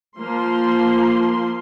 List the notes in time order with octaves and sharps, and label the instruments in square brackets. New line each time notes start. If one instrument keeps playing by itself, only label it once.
[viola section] F3 A#3 C6